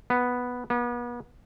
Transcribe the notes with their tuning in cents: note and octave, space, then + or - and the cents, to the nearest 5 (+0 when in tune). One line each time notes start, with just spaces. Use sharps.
B3 -5
B3 -40